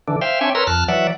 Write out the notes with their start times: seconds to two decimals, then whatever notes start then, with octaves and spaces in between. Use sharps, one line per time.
0.08 D3 E3 D4
0.21 C5 E5 F5 G5
0.41 C4 D4 C#5 E5 G5 G#5
0.55 A#4 B4 C#5 A#5 C6 E6
0.67 F2 A5 F6 F#6
0.88 E3 F#3 D5 E5 F#5